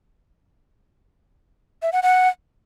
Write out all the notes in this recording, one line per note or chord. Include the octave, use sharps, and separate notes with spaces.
E5
F#5
F#5